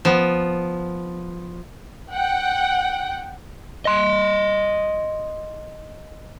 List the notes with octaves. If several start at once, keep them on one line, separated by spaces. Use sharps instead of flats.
F3 B3
F#5 G5
D#5 C6